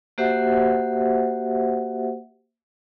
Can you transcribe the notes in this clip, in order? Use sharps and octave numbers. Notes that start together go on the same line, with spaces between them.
A#3 F#4 G4 C5 E5 F#5